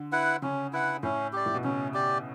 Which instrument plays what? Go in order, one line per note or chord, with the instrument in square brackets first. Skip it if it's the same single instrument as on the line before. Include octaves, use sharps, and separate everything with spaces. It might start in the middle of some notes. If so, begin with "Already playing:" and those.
Already playing: [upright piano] D3
[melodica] E4 B4 F#5
[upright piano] C#3 [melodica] C#4
[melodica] E4 B4 F#5
[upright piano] A2 [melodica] C#4
[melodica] G4 D5
[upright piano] A2
B2
[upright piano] C#3 [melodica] C#4
[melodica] G4 D5